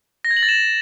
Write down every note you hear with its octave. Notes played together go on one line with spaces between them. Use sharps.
A#6
G#6
F#7
A6
E7